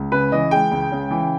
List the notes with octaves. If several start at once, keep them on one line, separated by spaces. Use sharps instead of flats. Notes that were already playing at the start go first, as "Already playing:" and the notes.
Already playing: C#2
C#3 B4
E3 D#5
G#3 G5
C#2
C#3
E3